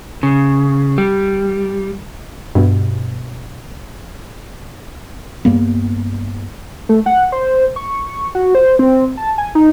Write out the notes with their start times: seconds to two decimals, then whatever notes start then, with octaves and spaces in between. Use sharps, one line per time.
0.23 C#3
0.98 G3
2.55 G2 B2
5.45 G2 A#3 B3
6.89 A3
7.06 F#5
7.32 C5
7.76 C#6
8.35 F#4
8.55 C5
8.79 C4
9.17 A5
9.38 G#5
9.55 D#4